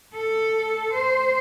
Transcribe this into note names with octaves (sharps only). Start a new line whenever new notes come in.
A4
C5